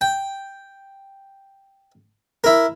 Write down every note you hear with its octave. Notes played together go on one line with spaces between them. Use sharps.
G5
E4 A#4